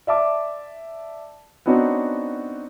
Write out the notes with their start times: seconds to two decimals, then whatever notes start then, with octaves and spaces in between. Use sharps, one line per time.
0.07 D5 E5 A5 D6
1.66 B3 C4 D4 D#4 F#4 C#5